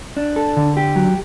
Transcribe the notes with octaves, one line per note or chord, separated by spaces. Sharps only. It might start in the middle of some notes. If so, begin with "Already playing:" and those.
D4
A4
D3
G4
F#3